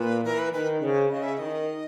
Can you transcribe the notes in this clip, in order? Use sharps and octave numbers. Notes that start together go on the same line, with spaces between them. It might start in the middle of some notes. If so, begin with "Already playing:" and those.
Already playing: A#2 B4
E3 A#4
B4
D#3 B4
C#3 C5 D5
C#3 D#5
E5
E5
D#3 D#5